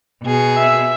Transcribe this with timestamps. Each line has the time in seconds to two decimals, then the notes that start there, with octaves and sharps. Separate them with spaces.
0.24 B2 G#4
0.58 E5